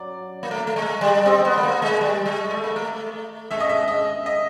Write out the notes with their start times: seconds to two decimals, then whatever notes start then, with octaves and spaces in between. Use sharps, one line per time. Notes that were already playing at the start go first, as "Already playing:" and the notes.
Already playing: F#3 D5
0.43 A#3
0.51 A3
0.67 A3
0.76 G#3
1.01 G3
1.26 C4 D#5
1.45 B3
1.57 A3
1.63 A#3
1.82 G#3
2.01 G3
2.26 G#3
2.51 A3
2.64 A#3
2.76 A3
3.51 G#3 E5
3.60 D#5
3.69 E5
3.88 D#5
4.26 D#5